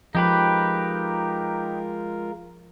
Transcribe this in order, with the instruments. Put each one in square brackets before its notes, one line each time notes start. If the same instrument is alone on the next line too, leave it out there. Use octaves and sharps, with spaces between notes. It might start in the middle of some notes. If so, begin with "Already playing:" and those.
[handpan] F3 [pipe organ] G#3 F4 A#4 [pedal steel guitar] D#4 G4 B4